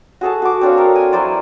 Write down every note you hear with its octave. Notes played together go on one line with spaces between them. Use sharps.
F#4 G#4 A4 A5
F#4 D6
C4 D4 C#5 F5
A4 A#4
G#5
F#3 E4 C5 D5